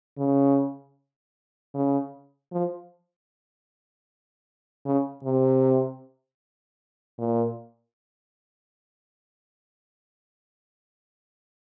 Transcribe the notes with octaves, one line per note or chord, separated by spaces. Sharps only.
C#3
C#3
F3
C#3
C3
A#2